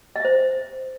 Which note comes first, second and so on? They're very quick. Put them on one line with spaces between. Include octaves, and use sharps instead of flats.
D#5 E5 C5